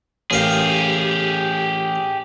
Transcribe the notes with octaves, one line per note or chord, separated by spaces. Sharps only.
A1 G4 G#4 A#4 F5